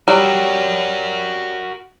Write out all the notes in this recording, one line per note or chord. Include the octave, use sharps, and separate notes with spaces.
F#3 G3 F#4 A#4